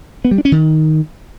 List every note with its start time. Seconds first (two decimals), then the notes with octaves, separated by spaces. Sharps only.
0.25 B3
0.31 G3
0.38 D4
0.45 C#4
0.52 D#3